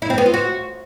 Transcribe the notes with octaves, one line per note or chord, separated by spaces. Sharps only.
E4
C4
B3
F4
F#4